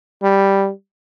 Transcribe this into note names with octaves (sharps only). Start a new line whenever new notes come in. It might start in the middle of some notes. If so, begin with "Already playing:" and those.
G3